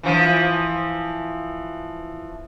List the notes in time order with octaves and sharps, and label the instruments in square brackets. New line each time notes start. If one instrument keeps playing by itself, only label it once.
[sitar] E3 F3 E4